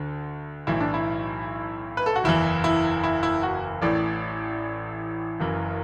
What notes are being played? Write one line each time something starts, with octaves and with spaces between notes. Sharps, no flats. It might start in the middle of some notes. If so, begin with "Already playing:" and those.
Already playing: D2 D3
B1 A2 E3 E4
D4
E4
B4
A4
F#4
F#1 E2 E3 E4
E4
E4
E4
F#4
A1 A2 E3 D5
F#1 F#2 E3